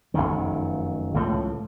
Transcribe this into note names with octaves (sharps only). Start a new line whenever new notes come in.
F1 B1 F#2 D#3
C#2 A2 F3